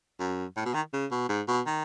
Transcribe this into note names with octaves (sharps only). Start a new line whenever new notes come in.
F#2
A2
B2
D#3
C#3
B2
G#2
B2
D#3